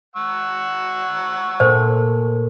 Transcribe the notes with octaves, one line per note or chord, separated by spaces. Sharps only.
F#5 C#6 E6
A#2 A3 C5